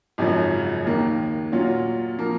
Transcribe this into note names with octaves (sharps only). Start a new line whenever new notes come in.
G#1 F#2 C#3 F3
D#2 D#3 A#3
A#2 F#3 C#4 F4
F3 A#3